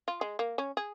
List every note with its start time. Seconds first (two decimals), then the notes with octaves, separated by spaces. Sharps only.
0.08 F4
0.21 G#3
0.39 A#3
0.58 C#4
0.77 G#4